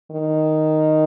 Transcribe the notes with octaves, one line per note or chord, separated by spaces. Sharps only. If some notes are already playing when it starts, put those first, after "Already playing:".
D#3